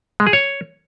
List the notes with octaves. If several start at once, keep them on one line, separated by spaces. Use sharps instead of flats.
G#3
G#4
C#5